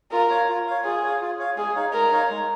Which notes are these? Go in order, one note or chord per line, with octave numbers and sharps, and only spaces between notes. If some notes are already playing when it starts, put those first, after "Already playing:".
F4 A#4
C#5 F5
F4
C#5 F5
F4 G#4
C#5 F5
F4
C#5 F5
G#3 G#4
D#4 C#5 F5
G#3 A#4
D#4 C#5 F5
G#3